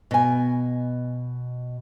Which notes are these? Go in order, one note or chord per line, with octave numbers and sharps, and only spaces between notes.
B2 G#5